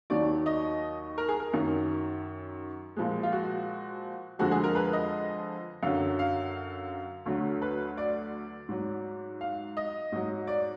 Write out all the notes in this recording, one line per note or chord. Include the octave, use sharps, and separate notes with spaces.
D#2 D#3 F#3 D5
D#5
A#4
G#4
A#4
F#2 D#3 F#3
A#2 F3 G#3
F4
F#4
F2 D3 F3 G#3 F#4
G#4
A#4
B4
D#5
F#2 D3 F#3 F5
F5
D2 D3 F#3
B4
D5
G#2 F#3
F5
D#5
G#2 F#3
D5